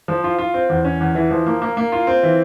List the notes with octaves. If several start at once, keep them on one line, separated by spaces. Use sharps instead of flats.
F3
F4
F4
C4
E2
C#4
E2
E3
F3
A#3
A#3
A#3
F4
C4
E3